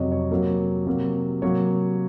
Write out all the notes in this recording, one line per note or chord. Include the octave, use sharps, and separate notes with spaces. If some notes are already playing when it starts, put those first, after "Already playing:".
Already playing: F2 C3 F#3 C#5 D#5
C#5
C3 F#3 A#3
C3 F#3 A#3
C3 F#3 A#3 C#5